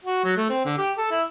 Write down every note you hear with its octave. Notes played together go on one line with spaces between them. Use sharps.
F#4
F#3
A3
C4
D3
G4
A4
E4